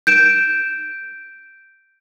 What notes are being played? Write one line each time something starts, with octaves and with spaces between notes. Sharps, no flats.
G6 D7 E7